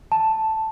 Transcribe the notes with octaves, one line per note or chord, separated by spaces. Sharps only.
A5